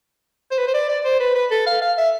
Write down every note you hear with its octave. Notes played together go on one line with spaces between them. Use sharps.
C5
B4
C5
D5
D5
C5
B4
B4
A4
F5
F5
E5